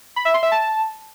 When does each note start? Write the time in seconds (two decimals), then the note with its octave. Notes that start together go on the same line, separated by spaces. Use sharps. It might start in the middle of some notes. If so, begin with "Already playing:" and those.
0.16 B5
0.25 E5
0.34 C6
0.43 E5
0.52 A5